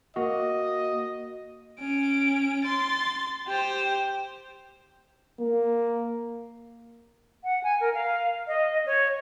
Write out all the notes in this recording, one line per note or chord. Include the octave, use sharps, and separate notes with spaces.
A#3 F#4 D#5
C#4 D7
C6 A6
G4 C5
A#3
F#5
G#5
A#4
F5
D#5
C#5